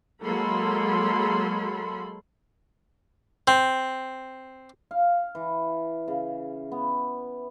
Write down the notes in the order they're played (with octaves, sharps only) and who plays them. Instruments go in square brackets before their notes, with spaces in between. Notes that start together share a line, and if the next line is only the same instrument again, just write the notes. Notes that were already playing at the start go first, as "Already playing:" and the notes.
[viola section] F#3 G#3 A#3 A4 B5 C6
[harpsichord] C4
[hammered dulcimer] F5
E3
C#3
B3